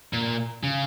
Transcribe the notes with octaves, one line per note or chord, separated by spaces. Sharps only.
A#2
C#3